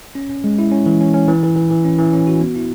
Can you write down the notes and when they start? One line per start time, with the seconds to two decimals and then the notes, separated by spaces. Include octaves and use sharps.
0.15 C#4
0.29 C#4
0.44 G#3
0.58 E4
0.72 C#4
0.86 E3
1.01 C#4
1.14 C#4
1.28 E3
1.43 E3
1.56 E3
1.70 E3
1.85 C#4
1.99 E3
2.13 C#4
2.27 F#4
2.41 B3
2.56 E4